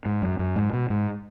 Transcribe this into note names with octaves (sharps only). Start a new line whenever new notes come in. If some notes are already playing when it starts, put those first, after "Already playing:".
G#2
F#2
F#2
G#2
B2
G#2